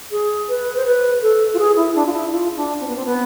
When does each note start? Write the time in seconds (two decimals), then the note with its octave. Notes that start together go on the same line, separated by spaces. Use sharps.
0.11 G#4
0.49 B4
0.77 C5
0.86 B4
1.22 A4
1.54 F4
1.59 G#4
1.76 E4
1.95 D4
2.06 F4
2.13 E4
2.32 F4
2.56 D4
2.80 C4
2.88 B3
2.96 C4
3.06 B3